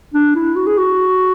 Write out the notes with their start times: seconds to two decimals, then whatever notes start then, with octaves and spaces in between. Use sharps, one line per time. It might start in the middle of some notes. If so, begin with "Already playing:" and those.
0.14 D4
0.35 E4
0.56 F#4
0.67 G#4
0.78 F#4